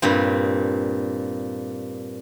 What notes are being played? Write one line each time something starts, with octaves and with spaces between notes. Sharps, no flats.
G2 A#2 C4